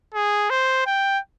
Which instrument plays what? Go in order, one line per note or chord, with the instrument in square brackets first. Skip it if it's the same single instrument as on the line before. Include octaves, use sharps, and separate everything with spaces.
[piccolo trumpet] G#4
C5
G5